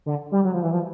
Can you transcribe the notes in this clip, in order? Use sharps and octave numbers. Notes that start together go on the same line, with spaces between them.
D3
G3
F#3
F3
E3
F3